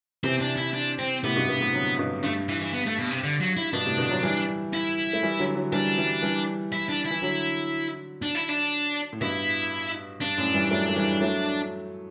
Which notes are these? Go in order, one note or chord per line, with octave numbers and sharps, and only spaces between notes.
C3 E3 C4
D4
E4
D4
C4
A2 C3 B3
G2 B2
G2 B2
A2 C3
D3 F#3
G2 B2
G2 A3
E3
E3
B3
A3
B2
C3
D3
F#3
E4
G2 B2 D4
A2 C3
B2 D3
D3 F#3
E3 G3
E4
A3
E3 G3
D3 F#3
D3 F#3
E3 G3 D4
E3 G3
E3 G3
E4
D4
E4
E3
D3 F#3
D4
E4
D4
A2
G2 B2 E4
G2 D4
F#2 A2
E3 G3
F#3 A3
A3
E3 G3
F#3 A3